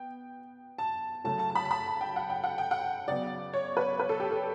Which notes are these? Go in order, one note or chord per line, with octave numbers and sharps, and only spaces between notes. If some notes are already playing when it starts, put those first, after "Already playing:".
Already playing: B3 G5
A5
C#3 F#3 A3 C#4 A5
A5
A5
B5
A5
B5
A5
G5
F#5
G5
F#5
G5
F#5
C#3 F#3 B3 D5
C#5
B4
B4
A4
G4
A4